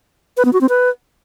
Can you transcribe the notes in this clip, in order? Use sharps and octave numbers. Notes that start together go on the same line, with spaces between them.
B4
B3
F#4
C4
B4